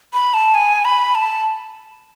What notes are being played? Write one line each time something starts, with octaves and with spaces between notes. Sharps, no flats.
B5
A5
G#5
B5
A5